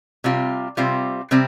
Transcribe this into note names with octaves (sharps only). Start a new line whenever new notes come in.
C3 G3 C4 F4
C3 G3 C4 F4
C3 G3 C4